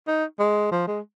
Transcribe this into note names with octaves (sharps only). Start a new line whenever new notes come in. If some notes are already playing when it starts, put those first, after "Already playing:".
D#4
G#3
F3
G#3